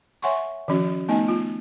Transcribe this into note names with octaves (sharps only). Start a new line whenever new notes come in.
C#5 E5 F#5 G#5 C6 C#6
D#3 F3 C#4 F#4
A3 B3 D#4 D#5 G#5
F4